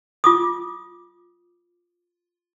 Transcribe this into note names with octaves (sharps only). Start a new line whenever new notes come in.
F4 D6 D#6